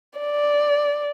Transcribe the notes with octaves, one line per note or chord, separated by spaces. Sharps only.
D5